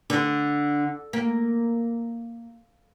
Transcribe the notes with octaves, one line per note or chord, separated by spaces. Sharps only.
D3
A#3